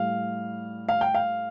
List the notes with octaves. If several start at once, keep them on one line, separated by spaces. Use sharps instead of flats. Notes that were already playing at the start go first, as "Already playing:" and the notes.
Already playing: A2 G3 F5
F5
G5
F5